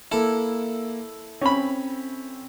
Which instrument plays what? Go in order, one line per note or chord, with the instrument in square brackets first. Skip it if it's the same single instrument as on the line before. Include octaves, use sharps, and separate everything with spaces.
[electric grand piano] A#3 E7 [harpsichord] E4 A4
[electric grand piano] C4 [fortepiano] C#4 B5